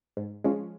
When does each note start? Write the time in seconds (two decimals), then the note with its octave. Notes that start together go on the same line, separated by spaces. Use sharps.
0.17 G#2
0.44 F3 G#3 C#4